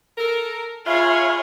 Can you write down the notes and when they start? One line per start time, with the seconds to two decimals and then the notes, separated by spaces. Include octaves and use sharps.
0.18 A4 A#4
0.86 F4 G#4 C#5 E5 B5 F6